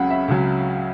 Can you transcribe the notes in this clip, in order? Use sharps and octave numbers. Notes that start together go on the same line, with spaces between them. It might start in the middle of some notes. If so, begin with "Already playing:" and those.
Already playing: C#2 C#3 F#3 C#4 F#5 B5
E5
C#2 C#3 F#3 C#4